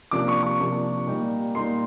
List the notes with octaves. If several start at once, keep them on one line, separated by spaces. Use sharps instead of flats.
C3 F3 A#3 D4 D6
C#6
C#6
C3 F3 A#3 D4
A#2 G3 A#3 D#4
A#2 G3 A#3 D#4 C6